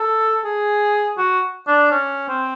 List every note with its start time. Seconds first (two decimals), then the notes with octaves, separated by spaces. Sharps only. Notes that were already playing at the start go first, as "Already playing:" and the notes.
Already playing: A4
0.45 G#4
1.18 F#4
1.67 D4
1.91 C#4
2.28 C4